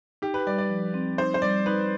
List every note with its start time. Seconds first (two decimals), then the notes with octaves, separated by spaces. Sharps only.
0.22 D#4 G4
0.34 B4
0.47 G3 D5
0.58 D5
0.70 F3
0.94 C4
1.18 D#4 C5
1.34 C5
1.42 G3 D5
1.66 D#4 B4